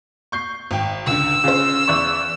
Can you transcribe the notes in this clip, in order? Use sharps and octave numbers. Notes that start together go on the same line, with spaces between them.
C#6 G6 C7
G#1 G5
C#2 D3 E6
C#3 F4 C5
E2 D5 C#6